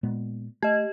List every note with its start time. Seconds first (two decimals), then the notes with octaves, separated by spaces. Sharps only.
0.03 A#2 G#3 B3
0.63 A3 G4 D#5